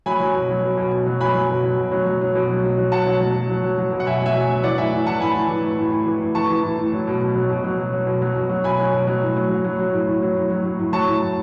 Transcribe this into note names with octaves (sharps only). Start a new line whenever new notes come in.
F#3 G#5 B5
F#3
B2
F#3
B2
B2
B2
F#3
F#3 G#5 B5
F#3
B2
F#3
B2
F#3
F#3
F#3
B2
F#3
F#3
F#3
B2 F#5 A5
F#3
F#3
F#3
F#3
F#3
F#3
B2
F#5
B2 E5 G#5
F#3 E5 G#5
F#3
F#3
E3 D5 F#5
A2 E5 G#5
A2
E3 F#5 A5
A2 G#5 B5
E3
E3
A2
A2
A2
E3
A2
E3 A5 C#6
E3
A2
A2
F#3
B2
B2
F#3
B2
F#3
F#3
F#3
B2
F#3
B2
F#3
B2 G#5 B5
F#3
B2
F#3
A2
F#3
F#3
F#3
F#3
A2
A2
F#3
A2
F#3
F#3
A2
F#3 A5 C#6
A2
A2